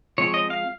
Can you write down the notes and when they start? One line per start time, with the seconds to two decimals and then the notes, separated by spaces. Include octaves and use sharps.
0.18 F3 G#3 C4 C#5
0.34 D#5
0.50 F5